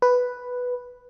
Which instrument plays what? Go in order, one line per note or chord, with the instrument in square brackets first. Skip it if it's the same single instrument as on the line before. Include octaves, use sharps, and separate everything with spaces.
[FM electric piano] B4